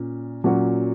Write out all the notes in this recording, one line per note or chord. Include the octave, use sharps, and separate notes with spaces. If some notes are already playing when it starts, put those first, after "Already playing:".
Already playing: A#2 C#4
A#2 F#3 C#4 F#4